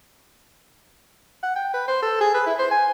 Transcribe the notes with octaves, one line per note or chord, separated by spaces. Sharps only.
F#5
G5
B4
C5
A4
G#4
B4
E4
C5
G#5